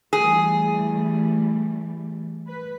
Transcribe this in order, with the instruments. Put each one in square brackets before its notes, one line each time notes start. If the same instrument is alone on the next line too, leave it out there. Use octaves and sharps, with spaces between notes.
[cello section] E3 G3 A3 [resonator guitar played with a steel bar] G#4
[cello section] B4